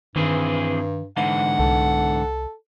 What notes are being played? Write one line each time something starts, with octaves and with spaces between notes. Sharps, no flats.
G2 D#3 E3 C4 G#4
G#2 D3 E3 F#5
C2 A4